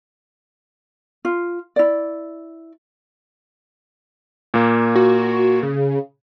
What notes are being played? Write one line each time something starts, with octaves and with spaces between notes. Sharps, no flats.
F4
E4 D5
A#2 A#3
F#4
C#3